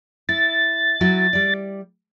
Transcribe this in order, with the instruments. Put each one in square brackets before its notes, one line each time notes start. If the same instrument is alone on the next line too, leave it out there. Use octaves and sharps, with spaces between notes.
[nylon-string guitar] E4 [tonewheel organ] A6
[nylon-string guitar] F#3 E4 F#4
G3 D5